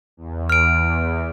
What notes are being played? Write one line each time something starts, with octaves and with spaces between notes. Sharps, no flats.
E2
F6 D7